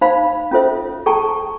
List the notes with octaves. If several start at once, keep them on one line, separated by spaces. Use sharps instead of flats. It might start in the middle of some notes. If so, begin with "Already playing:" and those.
D#4 C5 F5 B5
C#4 F4 A4 C5 E5
G#4 A4 G5 A5 A#5 C#6